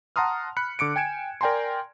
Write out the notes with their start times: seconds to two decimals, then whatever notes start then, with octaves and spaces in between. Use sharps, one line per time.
0.16 F#5 A5 A#5 C6 D#6 F6
0.57 B5 F#6 C#7
0.79 D3 D6 C#7 D7
0.96 G5 G#5 G#6 D7 E7
1.41 A#4 D5 G5 G#5 A#5 C6